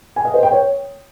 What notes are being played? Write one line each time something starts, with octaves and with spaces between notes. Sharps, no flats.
G#5
D#5
C5
G5
C#5